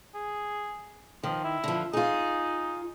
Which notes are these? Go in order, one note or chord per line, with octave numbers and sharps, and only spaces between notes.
G#4
D#3 F3
E4
D3 F3
D#4 F4 G#4